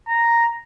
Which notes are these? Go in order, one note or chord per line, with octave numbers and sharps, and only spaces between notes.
A#5